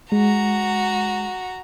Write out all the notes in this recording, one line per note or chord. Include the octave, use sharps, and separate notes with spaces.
G#3 F#4 A#5